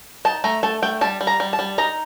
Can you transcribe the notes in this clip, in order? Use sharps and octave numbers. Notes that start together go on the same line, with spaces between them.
D#4 A5
A3 A#5
A3 A5
A3 G5
G3 A5
G3
A#5
G3
A5
G3
D#4 A#5